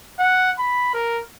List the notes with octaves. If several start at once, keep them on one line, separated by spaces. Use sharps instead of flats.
F#5
B5
A#4